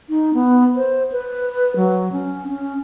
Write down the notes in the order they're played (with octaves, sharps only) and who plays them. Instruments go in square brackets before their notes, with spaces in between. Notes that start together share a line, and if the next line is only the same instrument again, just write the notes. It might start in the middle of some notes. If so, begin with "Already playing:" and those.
[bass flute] D#4
B3
C5
B4
F#3
C#4
C#4